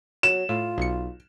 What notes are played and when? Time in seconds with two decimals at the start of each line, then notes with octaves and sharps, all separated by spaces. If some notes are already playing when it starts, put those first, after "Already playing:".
0.23 F#3 E7
0.49 A2 F4
0.78 B1 C#7